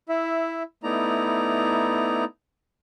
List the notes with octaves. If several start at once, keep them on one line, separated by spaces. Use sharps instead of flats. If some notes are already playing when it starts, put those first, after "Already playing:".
E4 E5
A3 B3 D#4 E4 D5 A#5